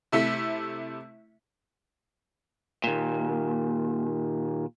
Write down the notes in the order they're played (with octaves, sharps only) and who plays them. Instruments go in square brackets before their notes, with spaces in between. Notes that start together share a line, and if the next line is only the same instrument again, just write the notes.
[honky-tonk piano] C3 A3 E4 B6
[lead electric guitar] D#2 A#2